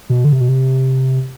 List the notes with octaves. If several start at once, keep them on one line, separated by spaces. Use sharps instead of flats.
B2
D3
C3
B2
C3